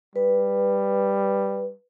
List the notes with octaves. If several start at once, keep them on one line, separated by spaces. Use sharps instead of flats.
G3 B4